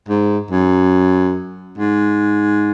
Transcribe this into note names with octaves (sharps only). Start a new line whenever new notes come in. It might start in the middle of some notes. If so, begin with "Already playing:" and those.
G#2
F#2
G#2